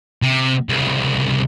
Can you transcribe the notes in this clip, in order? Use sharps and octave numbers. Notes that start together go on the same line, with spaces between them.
C3
C2 C#3